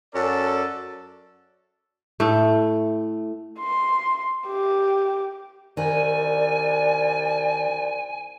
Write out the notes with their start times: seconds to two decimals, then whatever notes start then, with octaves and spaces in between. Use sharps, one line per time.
0.15 F#2 C#4 A4 D5
2.20 A2 A3
3.60 C6
4.47 G4
5.77 C2 D#3 D5 G#5